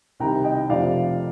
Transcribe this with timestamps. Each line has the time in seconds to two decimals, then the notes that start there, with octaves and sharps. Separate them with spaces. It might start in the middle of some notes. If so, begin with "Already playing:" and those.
0.20 C2 C3 D#3 G5 A#5
0.44 D#5 G5
0.69 F1 F2 C3 F3 D5 F5